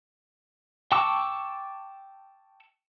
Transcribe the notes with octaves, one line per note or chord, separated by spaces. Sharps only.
G5 A5 C#6 D6 E6